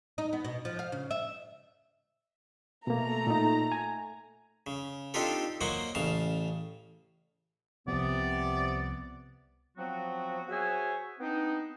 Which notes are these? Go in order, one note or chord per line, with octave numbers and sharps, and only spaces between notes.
D#4
B3
B2
F3
F5
C#3
E5
B2 A3 A#3 A#5
A#2 D#4
G#5
C#3
C4 D4 D#4 F4 G4 A4
F#3 A#3 C5 D5 D#5 F#5
A1 C#3 F5 A5
C2 C3 F3 B3 D5
F3 F#3 B3 C4 F#4
F#4 G#4 C5 C#5 E5 G#5
B3 C4 D4 D#4